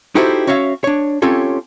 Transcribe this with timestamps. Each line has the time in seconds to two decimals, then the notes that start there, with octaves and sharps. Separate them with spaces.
0.15 D#4 E4 F#4 G4 A4 C5
0.47 C#4 F#4 C#5 E5 F5
0.84 D4 C#5
1.22 C4 C#4 F4 G4 A4 C#5